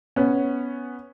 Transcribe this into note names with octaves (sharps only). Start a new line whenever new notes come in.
B3 C#4